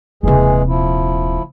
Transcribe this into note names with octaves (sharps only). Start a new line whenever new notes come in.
D#1 C3 E3 G#3 G#4
F3 E4